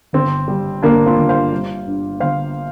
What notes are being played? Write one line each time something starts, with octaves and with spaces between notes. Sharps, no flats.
G1 C4
G3
G1 A#3 D4
C4 F4
G1
C5 F5
G3
G2
G1 C5 F5